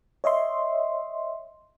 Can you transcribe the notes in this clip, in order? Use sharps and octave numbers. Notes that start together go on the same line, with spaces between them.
C#5 D#5 E5 C6